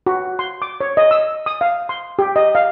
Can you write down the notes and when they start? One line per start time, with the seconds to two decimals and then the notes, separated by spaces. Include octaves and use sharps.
0.06 F#4
0.39 C6
0.62 D6
0.81 C#5
0.97 D#5
1.11 E6
1.46 D#6
1.61 F5
1.89 C6
2.19 G4
2.36 D#5
2.55 F5